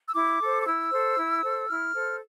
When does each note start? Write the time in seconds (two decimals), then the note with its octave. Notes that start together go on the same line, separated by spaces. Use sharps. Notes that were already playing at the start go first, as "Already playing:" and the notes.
0.07 E6
0.15 E4 D6
0.41 A4 C5
0.62 D6
0.66 E4 E6
0.92 A4 C5
1.18 E4
1.43 A4 C5
1.68 E4 F6
1.94 A4 C5